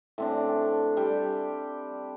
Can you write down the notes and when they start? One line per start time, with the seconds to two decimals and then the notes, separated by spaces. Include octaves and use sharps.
0.18 A2 C4 D4
0.97 G3 G5